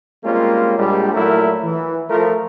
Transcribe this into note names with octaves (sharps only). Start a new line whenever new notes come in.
G3 G#3 A#3 C4 C#4 F4
A#1 G3 G#3
A#2 F#3 A3 E4 A#4
E3
F3 A3 A#4